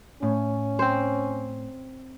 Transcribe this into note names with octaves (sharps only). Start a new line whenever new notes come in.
A2 C#4
C4 C5